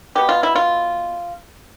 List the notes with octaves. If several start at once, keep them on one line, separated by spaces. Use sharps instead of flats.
B2 B3 G4
F4
E4
F4